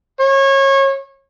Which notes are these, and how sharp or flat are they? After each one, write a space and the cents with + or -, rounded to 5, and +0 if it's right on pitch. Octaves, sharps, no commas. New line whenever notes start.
C#5 -25